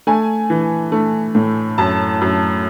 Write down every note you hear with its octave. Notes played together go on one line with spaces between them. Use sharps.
A3 G#5
E3
A3
A2
F#2 A5
F#2